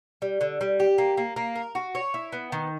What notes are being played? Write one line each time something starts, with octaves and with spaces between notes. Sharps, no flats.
G3
D3
G3
G4
A#3
A#3
A#3
A#4
F#4
C#5
E4
B3
D#3